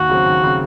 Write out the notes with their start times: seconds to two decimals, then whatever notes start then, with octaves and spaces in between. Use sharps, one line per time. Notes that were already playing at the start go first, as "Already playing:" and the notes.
Already playing: D#2 F#4
0.09 C#3 F#3 C4
0.26 D#2
0.43 C#3 F#3 C4